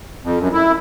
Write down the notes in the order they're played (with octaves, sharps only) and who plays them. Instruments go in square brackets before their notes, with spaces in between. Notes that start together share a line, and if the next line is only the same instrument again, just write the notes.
[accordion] F2
F#2
E4